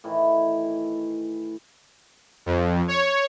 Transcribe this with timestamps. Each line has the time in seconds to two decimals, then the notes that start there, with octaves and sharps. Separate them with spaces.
0.04 A2 D#3 E3
2.46 F2
2.88 C#5